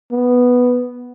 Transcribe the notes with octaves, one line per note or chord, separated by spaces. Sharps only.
B3